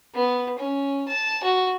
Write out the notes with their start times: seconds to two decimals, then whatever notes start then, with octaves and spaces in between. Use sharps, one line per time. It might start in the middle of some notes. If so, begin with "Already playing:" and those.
0.15 B3
0.58 C#4
1.08 A5
1.44 F#4